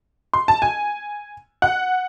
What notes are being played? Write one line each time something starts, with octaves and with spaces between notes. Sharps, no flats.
C6
A5
G#5
F#5